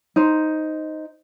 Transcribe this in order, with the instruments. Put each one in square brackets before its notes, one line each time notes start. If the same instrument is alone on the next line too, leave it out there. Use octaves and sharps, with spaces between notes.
[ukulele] D#4 C5